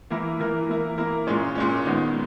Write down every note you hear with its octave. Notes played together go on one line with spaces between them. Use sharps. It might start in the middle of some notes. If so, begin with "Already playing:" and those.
E3 A#3 E4 A#4
E3 A#3 E4 A#4
A#3 E4 A#4
A#3 E4 A#4
A#2 G#3 C#4
A#2 G#3 C#4
D#3 G#3 B3